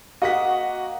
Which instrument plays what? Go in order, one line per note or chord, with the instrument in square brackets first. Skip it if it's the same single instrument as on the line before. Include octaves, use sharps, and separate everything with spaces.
[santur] A#3 G#4 A#4 [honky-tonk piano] F#4 [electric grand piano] D#5 F#5 B6